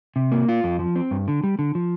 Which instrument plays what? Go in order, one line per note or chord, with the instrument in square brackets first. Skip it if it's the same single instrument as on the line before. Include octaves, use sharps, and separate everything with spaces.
[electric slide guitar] C3
A#3
F4
F2
F3
C4
G2
D3
G3
D3
F3